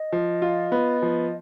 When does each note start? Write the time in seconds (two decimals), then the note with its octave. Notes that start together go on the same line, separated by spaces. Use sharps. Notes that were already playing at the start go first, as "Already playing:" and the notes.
Already playing: D#5
0.12 F3
0.42 F4
0.72 B3
1.02 F3